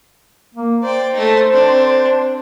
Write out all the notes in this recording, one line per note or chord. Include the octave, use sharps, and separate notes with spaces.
A#3
C5 D5 G5
A3 D#4
C4 D4